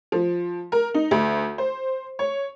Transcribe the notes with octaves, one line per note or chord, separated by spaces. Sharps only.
F3
A#4
D#4
D2
C5
C#5